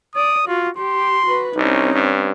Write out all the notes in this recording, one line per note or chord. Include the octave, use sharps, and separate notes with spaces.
D5 D#6
F4 F#4
G4 C6
F#4 B4
C2 C4 C#4 D#4
G2